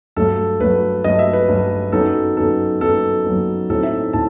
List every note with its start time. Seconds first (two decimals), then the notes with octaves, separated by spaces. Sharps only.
0.16 G2 F#3 A3 A4
0.60 G2 F#3 A3 B4
1.04 G2 F#3 A3 D#5
1.19 E5
1.33 B4
1.48 G2 F#3 A3
1.92 F#2 F#3 B3 D#4 A4
2.37 F#2 F#3 B3 D#4 A4
2.81 F#2 F#3 B3 D#4 A4
3.24 F#2 F#3 B3 D#4
3.70 A2 F#3 C4 D#4 A4
3.83 E5
4.13 A2 A5